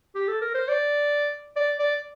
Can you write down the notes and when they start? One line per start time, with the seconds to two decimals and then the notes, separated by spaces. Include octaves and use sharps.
0.15 G4
0.28 A4
0.41 A#4
0.54 C5
0.68 D5
1.56 D5
1.79 D5